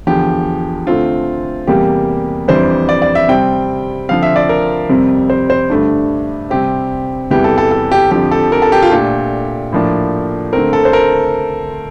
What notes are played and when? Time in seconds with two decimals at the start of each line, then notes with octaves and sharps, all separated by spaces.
0.07 E2 D3 F3 G4
0.87 D3 A3 C4 F4
1.67 E2 C3 G3 A#3 G4
2.48 F2 E3 G3 D4 C5
2.89 D5
3.02 D5
3.15 E5
3.28 C3 G3 C4 G5
4.09 D3 F3 C4 F5
4.23 E5
4.36 D5
4.49 A#4
4.89 F2 C3 G3 C4
5.30 C5
5.50 C5
5.70 G2 D3 A3 D4
6.50 C3 G3 C4 G4
7.31 E2 C3 E3 G3 G4
7.44 A4
7.58 A4
7.71 A4
7.92 G4
8.11 F2 D3 F3 G4
8.32 A4
8.52 A#4
8.62 A4
8.72 G4
8.82 F4
8.91 A#2 A3 D4 G4
9.73 A2 F3 A#3 D4
10.53 D3 A3 C4 A#4
10.73 A4
10.85 C5
10.93 A#4